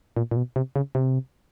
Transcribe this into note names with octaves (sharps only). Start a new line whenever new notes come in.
A#2
A#2
B2
C3
C#3
C3